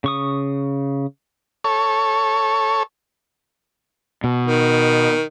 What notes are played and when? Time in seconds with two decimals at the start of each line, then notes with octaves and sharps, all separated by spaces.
0.04 C#3 C#6 D#6
1.64 A4 C#5
4.24 B2
4.46 D#3